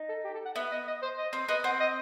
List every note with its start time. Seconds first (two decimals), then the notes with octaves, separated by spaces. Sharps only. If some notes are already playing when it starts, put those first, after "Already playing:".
Already playing: D#4
0.09 A4
0.24 G4
0.34 A4
0.45 F#5
0.56 B3 E5
0.71 D#5
0.87 D#5
1.02 C5
1.18 D#5
1.33 C4
1.49 B3 D#5
1.64 C4 F#5
1.80 D#5